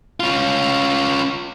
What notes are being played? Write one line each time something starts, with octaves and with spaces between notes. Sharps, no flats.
C#4 F4